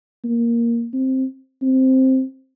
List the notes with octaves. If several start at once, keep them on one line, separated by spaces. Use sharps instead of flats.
A#3
C4
C4